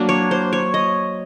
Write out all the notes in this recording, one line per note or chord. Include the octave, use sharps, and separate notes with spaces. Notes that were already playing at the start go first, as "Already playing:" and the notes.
Already playing: F#3 A#3 D4
C#5
C5
C#5
D#5